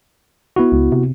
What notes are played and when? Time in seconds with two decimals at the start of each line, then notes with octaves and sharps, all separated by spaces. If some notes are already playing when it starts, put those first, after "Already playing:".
0.56 B3 E4 F#4
0.72 C#2
0.92 C3